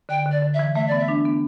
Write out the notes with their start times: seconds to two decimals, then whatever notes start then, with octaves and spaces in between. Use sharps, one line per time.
0.09 D3 G5
0.26 D3
0.31 D5
0.42 D3
0.54 E5
0.59 E3
0.75 A3 E5
0.88 B3 D5
0.99 E5
1.08 D4
1.25 B3